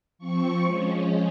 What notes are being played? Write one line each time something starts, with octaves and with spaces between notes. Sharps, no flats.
F3 C4 C#6
F3 G#3 C#4